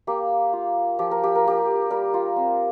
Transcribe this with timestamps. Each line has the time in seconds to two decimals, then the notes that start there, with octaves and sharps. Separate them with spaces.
0.07 A#3 G4
0.53 F4
0.99 F3 G4
1.11 A#4
1.23 G4
1.35 A#4
1.45 A#3 G4
1.90 G3 A#4
2.14 F4
2.36 C4